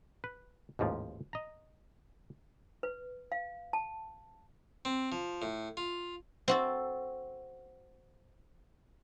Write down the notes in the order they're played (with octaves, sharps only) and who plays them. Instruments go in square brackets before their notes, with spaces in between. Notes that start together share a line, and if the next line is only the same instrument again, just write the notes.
[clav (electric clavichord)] B4
A1 D#2 G#2 F3
D#5 A#5
[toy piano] B4
F5
A5
[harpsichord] C4
F3
A2
F4
[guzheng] C4 F#4 A4